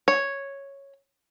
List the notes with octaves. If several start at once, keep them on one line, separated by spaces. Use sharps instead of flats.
C#5